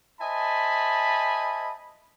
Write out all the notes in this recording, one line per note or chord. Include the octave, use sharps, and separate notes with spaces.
C5 D#5 E5 G#5 A5 B5